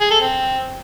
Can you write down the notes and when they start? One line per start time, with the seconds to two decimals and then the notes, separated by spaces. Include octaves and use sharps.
0.01 G#4
0.11 A4
0.21 C4